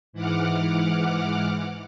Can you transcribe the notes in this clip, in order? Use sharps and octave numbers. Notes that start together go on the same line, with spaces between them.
G#2 E3 F#5 D6 F6